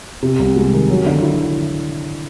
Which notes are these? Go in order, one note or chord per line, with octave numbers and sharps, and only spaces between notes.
C3
C2
G#3
D#3
F#3
D3
E4